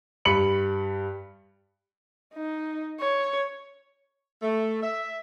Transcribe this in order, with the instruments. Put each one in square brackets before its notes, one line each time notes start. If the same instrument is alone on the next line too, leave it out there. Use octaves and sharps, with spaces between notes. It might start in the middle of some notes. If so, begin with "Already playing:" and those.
[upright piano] G2 B5 C#7 F#7
[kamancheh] D#4
C#5
[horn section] A3
E5